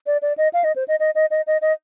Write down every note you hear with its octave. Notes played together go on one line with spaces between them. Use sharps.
D5
D5
D#5
F5
D#5
C5
D#5
D#5
D#5
D#5
D#5
D#5